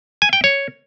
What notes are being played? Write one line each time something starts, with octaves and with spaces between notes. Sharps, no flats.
G#5
G5
C#5